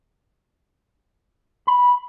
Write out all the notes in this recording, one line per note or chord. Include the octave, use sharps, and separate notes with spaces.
B5